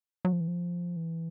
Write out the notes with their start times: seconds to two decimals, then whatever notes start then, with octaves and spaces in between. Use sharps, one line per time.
0.25 F#3
0.32 F3
0.40 E3
0.48 F3
0.96 E3